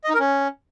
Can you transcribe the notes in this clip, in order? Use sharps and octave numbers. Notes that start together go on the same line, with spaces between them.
D#5
D#4
A#4
C#4